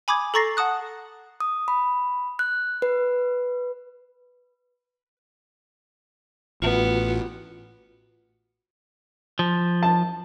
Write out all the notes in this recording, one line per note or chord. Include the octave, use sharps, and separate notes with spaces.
G#5 B5 D6 D#6 G#6
A4 A#5 C#6 A6 A#6 C7
F#5 A5 D#6 F#6
D#6
B5
F#6
B4
A1 A2 B3 F4 F#4
F3
A5